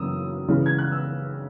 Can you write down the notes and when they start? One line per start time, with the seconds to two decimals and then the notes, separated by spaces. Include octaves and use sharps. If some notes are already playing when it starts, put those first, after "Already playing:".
Already playing: F#2 C#3 E3 A#3 C#4 D#6 E6
0.48 C#3 E3 G#3
0.66 G#6
0.78 F#6
0.91 E6